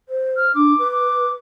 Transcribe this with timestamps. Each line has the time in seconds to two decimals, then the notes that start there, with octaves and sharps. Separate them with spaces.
0.09 C5
0.36 F6
0.55 D4 D6
0.79 B4
0.92 D6